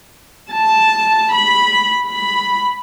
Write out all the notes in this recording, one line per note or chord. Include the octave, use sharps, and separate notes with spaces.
A5
B5
B5